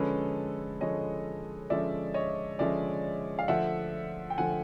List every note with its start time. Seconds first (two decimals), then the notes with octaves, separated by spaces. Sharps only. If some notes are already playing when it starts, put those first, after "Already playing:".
Already playing: D3 F3 G#3 C#4 A4 B4
0.81 D3 F3 G#3 C#4 C#5 D#5
1.70 D3 F3 G#3 C#4 D5 E5
2.14 C#5 D#5
2.59 D3 F3 G#3 C#4 D5 E5
3.39 F5
3.48 D3 F3 A3 E5 F#5
4.30 G5
4.37 D3 F3 A3 F#5 G#5